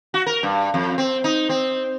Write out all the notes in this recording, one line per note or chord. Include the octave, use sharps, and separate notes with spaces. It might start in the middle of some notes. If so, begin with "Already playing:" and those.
F#4
A#4
G2
F2
C4
D#4
C4